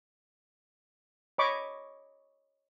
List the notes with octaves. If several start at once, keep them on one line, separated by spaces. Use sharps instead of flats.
C#5 D#5 B5 C#6 D6